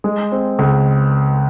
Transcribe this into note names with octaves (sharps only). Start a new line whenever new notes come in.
G#3
C4
C#2